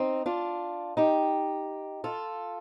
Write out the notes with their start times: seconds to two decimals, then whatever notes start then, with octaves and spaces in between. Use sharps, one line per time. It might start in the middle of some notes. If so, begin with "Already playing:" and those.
Already playing: C4 D#4
0.26 D4 F4
0.97 D#4 G4
2.04 F4 A4